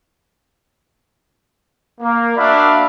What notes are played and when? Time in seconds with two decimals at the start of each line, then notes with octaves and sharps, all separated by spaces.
2.00 A#3
2.37 D4 F#4 D5 E5 F5 B5